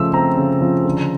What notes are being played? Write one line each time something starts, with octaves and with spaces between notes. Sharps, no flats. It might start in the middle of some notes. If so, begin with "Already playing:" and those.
Already playing: C#3 F3 A3 E6
C4 A#5
C#3
F3
D3